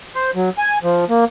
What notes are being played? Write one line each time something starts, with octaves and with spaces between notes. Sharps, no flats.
C5
F#3
G#5
F3
A#3